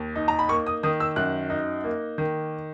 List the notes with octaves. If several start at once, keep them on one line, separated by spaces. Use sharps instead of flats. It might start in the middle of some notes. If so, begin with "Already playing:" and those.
Already playing: D#2
D#4
A#5
B5
A#3 C#6
D#6
D#3 D#6
E6
F#2 F#6
D#4
A#3
D#3